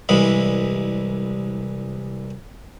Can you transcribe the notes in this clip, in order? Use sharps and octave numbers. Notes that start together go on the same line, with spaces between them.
C2 E3 G#3 B5